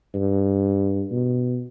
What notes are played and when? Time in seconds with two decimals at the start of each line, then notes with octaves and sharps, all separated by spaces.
0.14 G2
1.11 B2